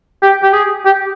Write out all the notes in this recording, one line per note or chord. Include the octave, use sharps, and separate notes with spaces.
G4
G4
G#4
G4